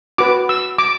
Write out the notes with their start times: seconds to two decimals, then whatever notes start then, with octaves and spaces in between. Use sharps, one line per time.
0.18 F#4 B4 D6
0.49 E6
0.78 D6